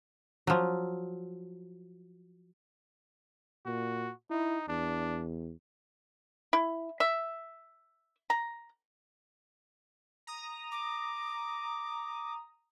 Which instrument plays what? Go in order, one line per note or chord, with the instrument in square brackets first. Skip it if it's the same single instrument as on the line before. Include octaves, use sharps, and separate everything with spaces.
[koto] F3 F#3
[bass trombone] A#2 [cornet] F#4
[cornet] D#4 [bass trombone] E4
[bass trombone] E2 [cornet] D4
[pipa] E4
E5
A#5
[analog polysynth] A#5 D#6
[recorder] D6